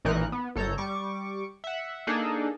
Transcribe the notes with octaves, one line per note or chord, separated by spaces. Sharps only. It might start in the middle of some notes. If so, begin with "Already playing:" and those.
A1 A#2 E3 D#4 A#4 F#6
B3
G1 A4 C#5 A#5 G6
G3 C#6 D6
E5 F#5
A#3 D4 D#4 G#4 A4